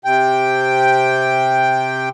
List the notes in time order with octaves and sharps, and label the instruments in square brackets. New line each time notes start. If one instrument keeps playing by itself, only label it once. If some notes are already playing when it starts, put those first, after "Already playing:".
[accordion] C3 G5